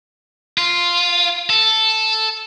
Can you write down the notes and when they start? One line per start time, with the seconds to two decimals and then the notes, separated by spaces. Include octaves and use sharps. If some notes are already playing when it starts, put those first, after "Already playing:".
0.58 F4
1.50 A4